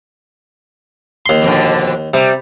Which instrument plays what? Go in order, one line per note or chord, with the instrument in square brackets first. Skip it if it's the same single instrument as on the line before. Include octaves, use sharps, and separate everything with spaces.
[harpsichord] D#2 C6
[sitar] F2 B2 D3
[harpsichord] C3 [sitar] G3